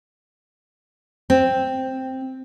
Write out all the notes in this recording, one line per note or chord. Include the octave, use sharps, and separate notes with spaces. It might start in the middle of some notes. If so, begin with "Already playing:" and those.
C4